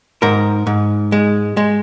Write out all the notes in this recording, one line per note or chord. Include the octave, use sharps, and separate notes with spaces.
G#2 A#4 A#5
G#2
G#3
G#3